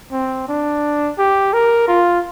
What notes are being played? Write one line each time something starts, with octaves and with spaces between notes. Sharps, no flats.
C4
D4
G4
A#4
F4